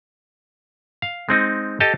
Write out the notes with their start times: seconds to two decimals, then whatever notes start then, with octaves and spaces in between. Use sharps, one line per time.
1.02 F5
1.29 G#3 C4 D#4
1.80 G4 A4 D#5 A5